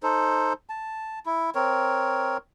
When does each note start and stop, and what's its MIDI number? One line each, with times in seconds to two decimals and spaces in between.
0.03 0.53 63
0.03 0.53 69
0.03 0.53 72
0.70 1.19 81
1.26 1.50 64
1.55 2.37 60
1.55 2.37 70
1.55 2.37 73